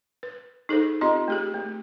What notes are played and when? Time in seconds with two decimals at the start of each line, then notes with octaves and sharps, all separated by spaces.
0.23 B4
0.69 D#4 G#4 A4 C5
1.01 C4 F4 G4 D#5 C6
1.28 A3 G4 G#4
1.54 A3